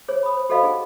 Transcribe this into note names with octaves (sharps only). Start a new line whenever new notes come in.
G#4 C5 C#5
B5 D#6
C5
F#4 A4 C5 D#5 F5 B5
D#4 G#4 F#5